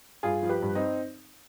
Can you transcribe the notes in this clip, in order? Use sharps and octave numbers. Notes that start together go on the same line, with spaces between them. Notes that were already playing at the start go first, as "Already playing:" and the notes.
G2 F4 G#4
F3
G4 B4
G2
C4 D#4